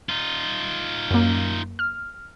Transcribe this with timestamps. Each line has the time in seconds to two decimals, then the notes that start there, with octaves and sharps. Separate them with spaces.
0.09 D#4 F4
1.11 F#2 A#3
1.79 F6